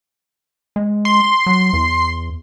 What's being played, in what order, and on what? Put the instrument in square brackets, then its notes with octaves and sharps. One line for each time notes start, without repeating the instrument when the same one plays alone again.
[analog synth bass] G#3
[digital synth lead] C6
[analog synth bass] F#3
E2